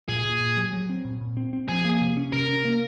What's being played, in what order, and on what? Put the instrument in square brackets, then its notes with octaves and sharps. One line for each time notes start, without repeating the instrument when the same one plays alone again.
[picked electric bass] A#2 [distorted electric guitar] G#4
[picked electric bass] A#2
A#2
F#3
F#3
C4
A#2
A#2
C4
C4
[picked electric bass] F3 [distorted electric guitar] G#4
[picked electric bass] A#3
C3
C#4
[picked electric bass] C3 [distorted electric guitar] A#4
[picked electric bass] C#4
A#3